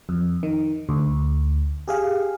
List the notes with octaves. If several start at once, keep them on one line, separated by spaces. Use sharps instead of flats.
F2
D#3
D2
G4 G#4 F5